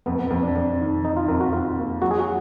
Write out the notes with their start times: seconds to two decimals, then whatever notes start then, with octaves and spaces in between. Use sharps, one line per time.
0.06 F2 B3
0.19 B3
0.30 F2 B3
0.43 D4
0.56 F2
0.80 D#3
1.04 D#3 D#4
1.17 F4
1.28 F2 A#4
1.41 F#4
1.52 F2 F4
1.77 A#3
2.02 F#3 F#4
2.11 G#4
2.19 F#4